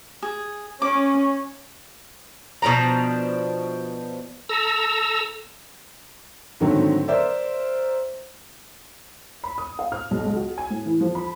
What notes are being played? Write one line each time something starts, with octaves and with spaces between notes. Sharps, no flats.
G#4
C#4 D6
B2 F3 D4 A#5
A4 A#5 E6
G#2 D3 D#3 F#3 A3 C4
A#4 C5 D5 E5
B5
D#6
F5
F6
B1
C#2
F#4
G#5
A2
E3
F3
B5